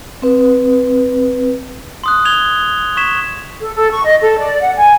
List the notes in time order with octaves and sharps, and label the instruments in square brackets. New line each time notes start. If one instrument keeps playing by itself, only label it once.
[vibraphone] C4 B4
[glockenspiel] C6 D#6 F#6
G#6 F7 G7
C#6 G#6 B6 E7
[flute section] A4
A4
C#6
D#5
A4
D5
F#5
G#5